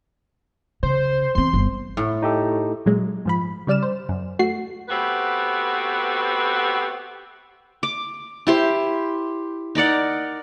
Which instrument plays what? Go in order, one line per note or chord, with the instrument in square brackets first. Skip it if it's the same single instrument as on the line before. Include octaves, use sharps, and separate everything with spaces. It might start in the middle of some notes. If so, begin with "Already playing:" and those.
[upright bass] C#3 [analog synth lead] C5
[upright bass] E3 C4 [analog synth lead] C6
[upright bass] G1
[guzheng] A2
[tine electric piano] D#4 G4 A4
[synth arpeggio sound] A#2 F#3 G#3
G#2 F3 B5
C#3 G3 D5 F6 E7
C5
F#2
A3 F#4 C7
[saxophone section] A3 B3 C4 F#4 G4 B4
[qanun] D6
E4 G4 C5
D#4 A#4 D5 F#5